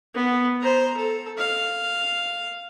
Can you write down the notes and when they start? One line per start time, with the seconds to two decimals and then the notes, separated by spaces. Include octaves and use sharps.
0.14 B3
0.61 C5 A#5
0.97 A4
1.38 F5